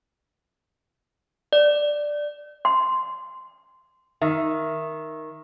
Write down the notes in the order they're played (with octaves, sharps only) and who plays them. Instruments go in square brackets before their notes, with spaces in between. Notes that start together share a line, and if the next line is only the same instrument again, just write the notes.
[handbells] D5
[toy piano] C6
[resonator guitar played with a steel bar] D#3 [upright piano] E5